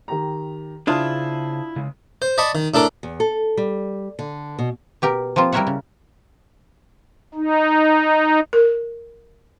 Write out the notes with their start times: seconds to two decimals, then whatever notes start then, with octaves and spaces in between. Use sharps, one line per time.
0.08 D#3 G4 A#5
0.87 C#3 D4 E4 F4 G#4 C5 A5 D#6
1.76 C#3 G#3
2.22 C5
2.38 D5 D#5 A5 B5 C#6
2.55 D#3
2.74 A2 D4 A4 A#4 D6
3.03 E2
3.20 A4
3.57 G3
4.19 D3
4.59 B2
5.02 B2 G4 A#4
5.36 F3 A#3 C4 F4
5.52 G3 E4 A#4 C#5 E5 F#5
5.67 C#3
7.35 D#4
8.53 A#4